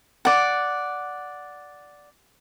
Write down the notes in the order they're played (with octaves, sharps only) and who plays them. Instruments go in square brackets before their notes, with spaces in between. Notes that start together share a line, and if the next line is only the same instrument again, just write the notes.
[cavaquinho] D5 F#5